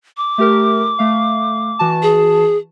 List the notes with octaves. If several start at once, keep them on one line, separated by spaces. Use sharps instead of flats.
D6
A3 G4 A#4
A3 F5
E3 F#4 A5
G#4